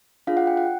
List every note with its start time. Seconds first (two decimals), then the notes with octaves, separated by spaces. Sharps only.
0.27 D4 F4 G#4 F5
0.37 F#5
0.47 G5
0.57 F#5